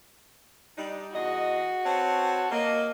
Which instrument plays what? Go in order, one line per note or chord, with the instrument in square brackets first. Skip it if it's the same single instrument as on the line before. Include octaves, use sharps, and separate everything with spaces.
[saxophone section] G3 D4 D#4
[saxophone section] E2 G#4 D#5 [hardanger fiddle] F#4
[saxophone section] C4 B4 C#5 [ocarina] A5
[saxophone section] A#3 [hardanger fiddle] D#5